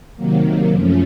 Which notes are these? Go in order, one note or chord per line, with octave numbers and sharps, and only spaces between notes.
C3 D#3 F#3 A#3
F#2 F3 A3 C#4